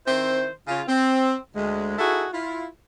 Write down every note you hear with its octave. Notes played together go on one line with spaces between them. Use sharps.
D#3 C4 E4 C5
C#3 F4
C4
D2 G#3
D#4 E4 F#4 G#4 A4
E4 F4